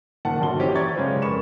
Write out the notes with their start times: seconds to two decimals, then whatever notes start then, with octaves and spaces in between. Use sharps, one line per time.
0.25 F#1 A#2 D#3 F#5 A5
0.41 G1 D4 F#4 C6 G7
0.59 E3 C#4 G4 C5 D#5
0.75 D5 E5 A#5 C#6 G#6 A6
0.95 C#3 G#3 C#4 F4 B4 C5
1.22 F2 A#4 B5 C#6 E7